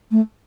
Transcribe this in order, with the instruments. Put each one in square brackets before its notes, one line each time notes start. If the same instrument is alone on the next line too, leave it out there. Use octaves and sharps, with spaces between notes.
[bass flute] A3